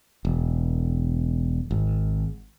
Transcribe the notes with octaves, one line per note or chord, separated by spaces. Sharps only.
E1
G#1